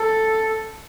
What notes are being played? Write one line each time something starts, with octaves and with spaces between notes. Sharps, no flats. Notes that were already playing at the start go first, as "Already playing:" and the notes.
Already playing: A4